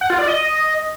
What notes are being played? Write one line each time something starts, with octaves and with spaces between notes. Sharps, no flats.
F#5
F4
D5
D#5